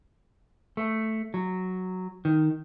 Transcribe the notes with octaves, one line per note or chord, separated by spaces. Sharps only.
A3
F#3
D#3